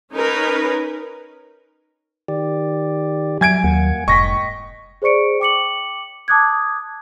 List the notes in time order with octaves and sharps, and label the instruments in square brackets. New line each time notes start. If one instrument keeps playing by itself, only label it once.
[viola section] C#4 D#4 A#4 B4
[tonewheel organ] D#3 G4 D5
[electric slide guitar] F#3 [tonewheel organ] E5 [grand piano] G#5 G#6 D7
[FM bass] D#2 [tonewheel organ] A#3 F#5
[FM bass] F1 [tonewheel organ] G#2 [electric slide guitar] D#5 G5 [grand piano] C#6 A#6 B6
[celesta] G#4 C5 D5 C#6 C#7 D7
G5 D6 C#7 F#7
A5 D6 D#6 F#6 G#6